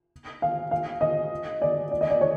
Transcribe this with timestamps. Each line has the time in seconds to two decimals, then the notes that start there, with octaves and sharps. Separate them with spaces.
0.42 F5
0.71 F5
1.01 D#5
1.62 D5
1.91 D5
2.01 D#5
2.10 D5
2.21 C#5